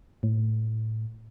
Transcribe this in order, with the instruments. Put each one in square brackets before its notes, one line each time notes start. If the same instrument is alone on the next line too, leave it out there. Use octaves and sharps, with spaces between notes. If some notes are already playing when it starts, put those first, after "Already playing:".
[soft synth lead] A2